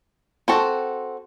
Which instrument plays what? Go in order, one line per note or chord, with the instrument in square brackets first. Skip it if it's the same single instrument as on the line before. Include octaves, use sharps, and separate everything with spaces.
[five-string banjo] C4 F#4 A4